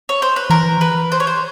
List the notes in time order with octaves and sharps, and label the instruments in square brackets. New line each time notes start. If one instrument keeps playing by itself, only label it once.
[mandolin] C#5
C5
B4
[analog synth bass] E3 [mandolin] A#4
[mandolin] B4
C5
C#5
C5